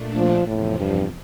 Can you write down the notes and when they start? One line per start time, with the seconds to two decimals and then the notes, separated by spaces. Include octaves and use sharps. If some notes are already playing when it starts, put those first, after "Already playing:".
Already playing: A#2 A3 D4
0.17 F3
0.47 E2 A2 C3 F3
0.78 G2